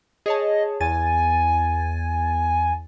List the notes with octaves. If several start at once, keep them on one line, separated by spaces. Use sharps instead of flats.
G#4 C#5 D#5 A5
E2 G#5 A6 D#7